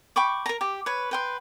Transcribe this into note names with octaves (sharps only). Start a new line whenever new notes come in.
G5 B5 C#6 D6
A#4 A#5
G4
B4 C#5
B4 G5 C6